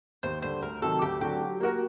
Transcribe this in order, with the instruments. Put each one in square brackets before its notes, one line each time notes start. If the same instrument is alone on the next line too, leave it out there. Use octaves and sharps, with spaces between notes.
[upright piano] D#2 [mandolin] C5
[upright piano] D3 G3 [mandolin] C5
[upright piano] D2 [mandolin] A#4
[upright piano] C3 D#3 F#3 C4 [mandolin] A4
[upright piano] D2 [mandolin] G4
[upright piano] D3 F#3 C4 F#4 [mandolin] G4
[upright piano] F#3
A#3 F#4 A#4